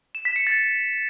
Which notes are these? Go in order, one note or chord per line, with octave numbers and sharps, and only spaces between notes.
E7
B6
C#7
A6